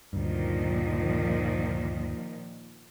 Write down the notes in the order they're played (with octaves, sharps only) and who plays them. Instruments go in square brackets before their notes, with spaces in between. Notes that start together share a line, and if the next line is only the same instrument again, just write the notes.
[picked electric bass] D2 G2 [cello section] A#2 D#3 F3